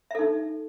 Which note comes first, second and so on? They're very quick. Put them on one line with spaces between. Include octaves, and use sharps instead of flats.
E5 A4 D#4